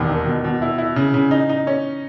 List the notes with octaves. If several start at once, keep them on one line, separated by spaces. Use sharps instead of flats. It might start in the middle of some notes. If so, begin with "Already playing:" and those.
Already playing: E1 D#2
D#3
B2
B2
E4
E4
C#3
C#3
D#4
D#4
C#4